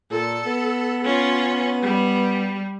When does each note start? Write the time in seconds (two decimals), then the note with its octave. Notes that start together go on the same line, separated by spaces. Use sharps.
0.11 A#2 A4
0.46 B3
1.05 C#4 F4
1.83 G3